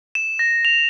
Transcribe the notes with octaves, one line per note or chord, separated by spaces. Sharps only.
E7
A#6
F7